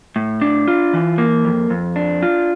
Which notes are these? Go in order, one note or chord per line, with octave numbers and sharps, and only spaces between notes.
A2
D4
F4
E3
A#3
F2
F2
D4
F4